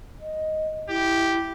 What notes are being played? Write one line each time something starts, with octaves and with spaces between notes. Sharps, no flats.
D#5
E4 G4